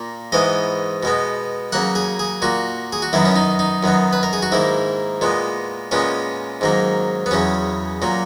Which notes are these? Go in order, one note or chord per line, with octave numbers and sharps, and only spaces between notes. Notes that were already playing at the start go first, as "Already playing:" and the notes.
Already playing: A#2 A#3
G#2 E3 G#3 B3 D#5
B2 G#3 B3
C#3 F#3 A#3 F#5
G#4
G#4
A#2 A#3 F#4
G#4
F#4
F#2 D#3 F#3 B3 E4
C#4
D#4
D#4
F#2 D#3 F#3 B3
B4
A#4
G#4
F#4
G#2 D#3 A#3 E4
A#2 G#3 B3
A#2 G#3 B3 C#4
G#2 D#3 F#3 A#3
B3
E2 C#3 F#3 C#4
A#2 F#3 A#3